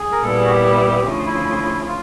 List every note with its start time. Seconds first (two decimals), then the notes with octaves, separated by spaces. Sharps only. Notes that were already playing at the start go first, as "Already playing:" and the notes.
Already playing: G#4
0.12 A#4
0.23 A#2 G3 B3 E4 A4
0.37 G#4
0.45 F#4
0.50 G4
1.05 D2 C#3 F3
1.26 E4
1.83 E4
1.87 F4